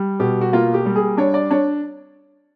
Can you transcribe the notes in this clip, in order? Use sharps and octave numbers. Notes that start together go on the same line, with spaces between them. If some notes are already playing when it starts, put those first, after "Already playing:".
Already playing: G3
B2 G4
F#4
A#3 F4
G4
G3
G#4
D4 C#5
D5
D4 C#5